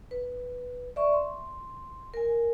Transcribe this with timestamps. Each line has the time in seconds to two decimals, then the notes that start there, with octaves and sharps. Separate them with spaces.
0.11 B4
0.96 D5 E5 C#6
1.13 C6
2.14 A#4 G#5